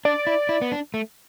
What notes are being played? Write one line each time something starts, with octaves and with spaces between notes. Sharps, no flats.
D4 D5
E4
E4
B3
D4
A3